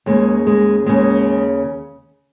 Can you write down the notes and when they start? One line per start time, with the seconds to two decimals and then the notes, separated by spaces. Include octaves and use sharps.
0.06 D#2 C#3 G#3
0.47 G#3
0.86 D#2 C#3 G#3